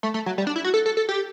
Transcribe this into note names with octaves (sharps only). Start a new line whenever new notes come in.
A3
A3
F#3
G3
D4
E4
F#4
A4
A4
A4
G4